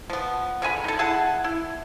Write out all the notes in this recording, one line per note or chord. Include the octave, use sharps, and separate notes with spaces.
F3 B3
D3 G#3 G#5 B5
D#4 A4
E4 G#4 F#5 A5
E4